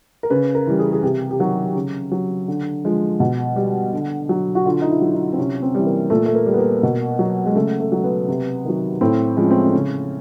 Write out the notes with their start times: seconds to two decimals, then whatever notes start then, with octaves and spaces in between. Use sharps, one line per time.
0.23 A#4
0.30 C#3 B4
0.55 A#4
0.67 E3 G3
0.79 G#4
0.92 G#4
1.03 C3 G4
1.31 G4
1.39 D#3 F#3 F#4
1.76 C#3
2.11 F#3
2.48 D3
2.85 F3 G#3
3.20 B2
3.56 G3
3.93 D3
4.29 F#3
4.55 F#4
4.65 D3 F4
4.82 D#4
4.90 E4
5.01 F#3
5.14 D#4
5.33 C4
5.38 C3 C#4
5.62 C4
5.75 E3 G3
5.86 A#3
6.10 A#2 A3
6.26 A3
6.35 A#3
6.47 G3
6.54 B3
6.59 A#3
6.83 B2
7.19 F#3
7.46 G#3
7.55 C#3 A3
7.80 A3
7.92 F#3
8.04 B3
8.29 C3
8.65 D#3 F#3
9.01 A2 C4
9.37 F3 G#3 C#4
9.51 C4
9.65 C#4
9.74 C#3